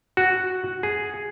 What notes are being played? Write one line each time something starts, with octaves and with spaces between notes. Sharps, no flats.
F#4
G#4